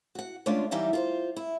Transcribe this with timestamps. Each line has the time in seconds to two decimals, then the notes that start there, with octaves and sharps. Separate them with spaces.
0.15 F#4 F#5
0.46 D3 G#3 A3 C#4 D4 F4
0.71 F#2 E3 G3 D#4 E5 F5
0.93 F4 A#4 C5
1.36 E4